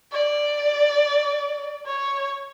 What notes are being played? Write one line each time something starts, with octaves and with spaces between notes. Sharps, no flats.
D5
C#5